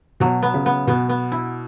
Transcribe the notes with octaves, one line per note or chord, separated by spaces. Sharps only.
B2 F#3
B3
C#3
B3
B2 B3
B3
E4